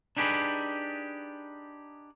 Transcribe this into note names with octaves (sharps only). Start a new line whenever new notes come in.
D4 D#4 G4 G#4 B4